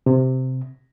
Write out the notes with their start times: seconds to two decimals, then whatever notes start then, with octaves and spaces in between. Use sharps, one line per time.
0.06 C3